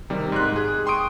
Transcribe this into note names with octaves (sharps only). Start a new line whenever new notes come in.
C3 D#3 G3
G#2 C6 F#6
G#4
G5 C6 C#6 D#6 D7